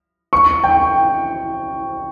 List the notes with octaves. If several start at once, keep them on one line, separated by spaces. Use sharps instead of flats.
C#6
G5